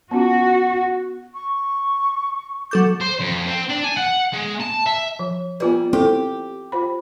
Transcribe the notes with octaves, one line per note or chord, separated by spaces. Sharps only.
B3 C#4 F4 F#4
C#6
F#3 A4 D6 G6
C5
F2
C4
D4
G#5
F#5
G#3
A5
E5
F3
G3 B3 F4 B4
C4 E4 G4 A4
F4 C5 B5